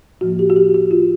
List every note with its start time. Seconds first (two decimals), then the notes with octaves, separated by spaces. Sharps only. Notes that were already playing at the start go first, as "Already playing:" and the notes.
0.21 A2 F3 A#3 F#4
0.39 G4
0.50 F#4
0.56 G4
0.74 F#4
0.91 F4